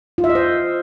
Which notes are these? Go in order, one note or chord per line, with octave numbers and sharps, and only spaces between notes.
F4
E5
D#5
C5